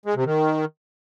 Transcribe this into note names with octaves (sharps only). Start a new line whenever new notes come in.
G#3
C3
D#3